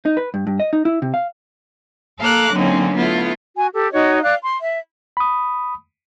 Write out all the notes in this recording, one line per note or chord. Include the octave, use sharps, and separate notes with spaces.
D#4
B4
G2
G2
D#5
D#4
E4
C3
F5
A#3 A4 F5 A#5 D6 F#6
D3 F#3 A#3 C4 C#4 D#4
A3 B3 E4 F4
F#4 G#5
G4 A4
D#4 F#4 C#5 D#5
D5 F5 F#6
C6
E5
B5 D#6